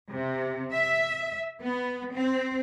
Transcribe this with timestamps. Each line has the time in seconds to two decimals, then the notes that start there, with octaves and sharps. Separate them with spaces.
0.13 C3
0.73 E5
1.62 B3
2.12 C4